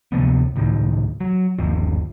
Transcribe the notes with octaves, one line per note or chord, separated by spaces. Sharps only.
D2 C3 F3 B3
C#2 A2 D#3
F#3
G1 D#2 F3